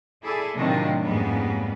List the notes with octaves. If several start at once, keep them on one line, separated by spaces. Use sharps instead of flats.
E4 G#4 A4 D5 E5
A2 C3 D#3 F#3 D4 F4
F2 G#2 G3 A#3 B3 C#4